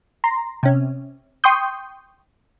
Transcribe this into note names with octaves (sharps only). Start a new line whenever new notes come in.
A#5 C6
C3 C#4
G5 C6 C#6 D#6 G6